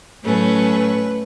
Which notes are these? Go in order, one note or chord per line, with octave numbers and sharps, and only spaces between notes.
A2 F#3 A3 C#4 B4